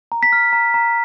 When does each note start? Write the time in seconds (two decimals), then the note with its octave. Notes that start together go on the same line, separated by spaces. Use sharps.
0.12 A#5
0.23 B6
0.32 F6
0.53 A#5
0.74 A#5